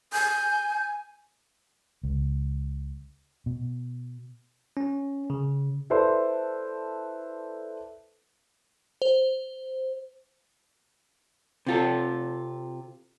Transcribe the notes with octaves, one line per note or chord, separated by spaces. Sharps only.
G#5 G6
C#2
B2
C#4
C#3
E4 A4 B4 C5 D5 C6
C5
C3 F4 A4